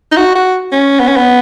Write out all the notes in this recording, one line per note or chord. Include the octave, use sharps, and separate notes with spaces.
D#4
F#4
F#4
C#4
B3
C#4
B3